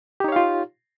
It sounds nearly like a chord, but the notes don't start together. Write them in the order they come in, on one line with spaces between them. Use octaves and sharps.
G4 D#4 C#5 F5 F4